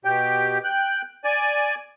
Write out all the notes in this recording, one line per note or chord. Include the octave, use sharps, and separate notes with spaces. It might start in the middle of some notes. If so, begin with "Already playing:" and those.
B2 G4 G5
G5 F#6
D5 G#5